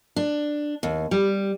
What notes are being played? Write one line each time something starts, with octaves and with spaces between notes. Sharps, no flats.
D4
D#2
G3